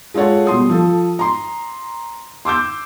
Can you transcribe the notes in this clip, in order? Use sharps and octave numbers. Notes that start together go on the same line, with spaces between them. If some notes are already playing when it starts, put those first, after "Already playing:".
G#3 F4 A4 C#5 F#5
B2 G3 C6 D#6
F3 A4
A#5 C6
C6 D6 E6 G6